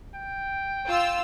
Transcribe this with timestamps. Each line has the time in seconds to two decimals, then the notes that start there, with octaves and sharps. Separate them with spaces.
0.15 G5
0.87 F4 E6